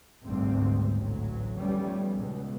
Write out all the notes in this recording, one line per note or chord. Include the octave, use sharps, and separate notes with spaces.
G#1 D2 G#2 B2 G3 C4
A1 D2 F#3
D#2 F3 G3 A3 B3 C#4
C#2 B2